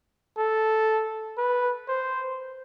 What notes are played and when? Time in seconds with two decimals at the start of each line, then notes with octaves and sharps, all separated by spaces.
0.37 A4
1.38 B4
1.88 C5